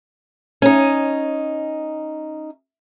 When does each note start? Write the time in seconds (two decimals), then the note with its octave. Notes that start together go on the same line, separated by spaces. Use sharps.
0.62 C#4 D#4